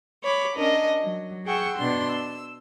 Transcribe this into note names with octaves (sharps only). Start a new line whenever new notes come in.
C#5 B5 D6
C#4 D4 A#4 D#5
F#3
G#4 F#5 G5 C#6 E6
B2 D4 C6
E6